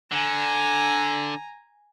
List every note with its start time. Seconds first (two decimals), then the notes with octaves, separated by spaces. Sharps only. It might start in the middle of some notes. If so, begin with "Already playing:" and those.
0.12 D3 G#5 A#5